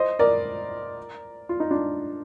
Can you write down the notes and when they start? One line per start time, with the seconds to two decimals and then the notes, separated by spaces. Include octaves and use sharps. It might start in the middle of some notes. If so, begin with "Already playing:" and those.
Already playing: C5 D#5
0.19 A#4 D5
1.49 F4
1.60 D#4
1.71 D4 F4